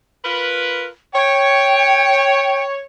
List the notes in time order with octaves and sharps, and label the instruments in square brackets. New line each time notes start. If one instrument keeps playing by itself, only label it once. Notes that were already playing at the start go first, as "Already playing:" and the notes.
[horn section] F4 A#4 B4
[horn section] C#5 [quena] G5